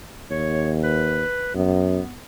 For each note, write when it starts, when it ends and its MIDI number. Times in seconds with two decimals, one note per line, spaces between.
0.31 1.23 39
0.31 0.74 73
0.84 1.53 71
1.55 1.99 42
1.55 2.19 59